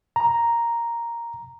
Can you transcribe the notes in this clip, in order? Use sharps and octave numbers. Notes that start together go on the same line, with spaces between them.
A#5